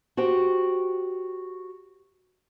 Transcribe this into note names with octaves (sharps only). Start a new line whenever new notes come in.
F#4 G4 C5 G5